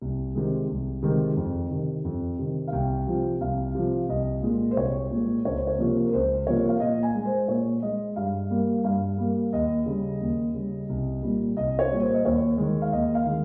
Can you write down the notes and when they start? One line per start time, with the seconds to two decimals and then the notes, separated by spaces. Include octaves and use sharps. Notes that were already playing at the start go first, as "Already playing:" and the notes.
0.02 C2
0.35 C3 D#3 G#3
0.69 C2
1.02 C3 D#3 G#3
1.37 F2
1.70 C3 D#3
2.05 F2
2.39 C3 D#3
2.68 F5
2.72 C2 G5
3.07 C3 F3
3.41 C2 F5
3.75 C3 F3
4.09 C2 D#5
4.42 A#2 G#3
4.71 C5
4.76 C2 C#5
5.11 A#2 G#3
5.45 C#2 C#5
5.56 C5
5.67 C#5
5.79 C3 F3 A#3
6.04 A#4
6.13 C#2 C5
6.47 C3 F3 A#3 C#5
6.69 F5
6.80 A#2 D#5
7.03 G#5
7.15 G#3
7.25 C5
7.48 A#2 C#5
7.82 G#3 D#5
8.16 G2 F5
8.50 G3 A#3
8.84 G2 F5
9.18 G3 A#3
9.53 D#2 D#5
9.86 C#3 G3
10.21 D#2
10.54 C#3 G3
10.89 C2
11.23 A#2 G3
11.57 C2 D#5
11.79 C#5
11.91 A#2 G3
12.02 C5
12.14 D#5
12.25 D#2 C#5
12.58 D#3 G#3
12.82 F5
12.93 D#2 D#5
13.15 F5
13.26 D#3 G#3